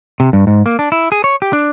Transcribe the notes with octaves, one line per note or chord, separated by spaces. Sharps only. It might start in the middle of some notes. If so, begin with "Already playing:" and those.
C3
G2
G#2
A#3
D4
E4
G#4
C#5
G4
D4